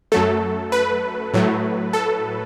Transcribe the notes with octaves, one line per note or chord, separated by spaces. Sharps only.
F#2 F#3 A3 A4
B4
A2 F#3 A3
A4